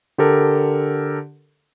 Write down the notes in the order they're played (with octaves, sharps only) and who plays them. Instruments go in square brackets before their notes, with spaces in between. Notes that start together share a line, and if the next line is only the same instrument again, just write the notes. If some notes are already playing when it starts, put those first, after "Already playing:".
[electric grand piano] D3 G4 A4 A#4